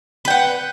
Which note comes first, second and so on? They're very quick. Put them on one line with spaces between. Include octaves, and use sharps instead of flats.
B4 G5 F#5